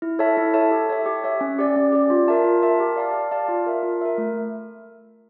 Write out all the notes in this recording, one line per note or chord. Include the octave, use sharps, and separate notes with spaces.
E4
A4 C#5 E5 A5
E4
A4 C#5 E5 A5
G4
C#5 E5
G4
C#5 E5
C#4
G4 D5
C#4
G4 D5
F4
A#4 E5 A5
F4
A#4 E5 A5
G4
D5 F5 A5
G4
D5 F5 A5
F4
A#4 E5
F4
A#4 E5
A3